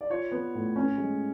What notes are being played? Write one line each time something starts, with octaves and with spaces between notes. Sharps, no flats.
D5
F4 C#5
B3
A2
C#4
G#3